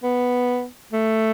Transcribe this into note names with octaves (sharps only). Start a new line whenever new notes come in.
B3
A3